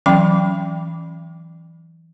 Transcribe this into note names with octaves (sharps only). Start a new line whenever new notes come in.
E3 F#3 C#4 G5 B5